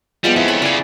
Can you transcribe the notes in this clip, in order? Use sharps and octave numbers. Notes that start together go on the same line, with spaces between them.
F3 G3 G#3 B3
F2 E4
C#5 A5 B5
F2 C#3 D5 G#5